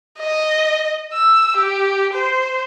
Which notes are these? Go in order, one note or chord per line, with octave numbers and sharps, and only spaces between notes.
D#5
E6
G4
C5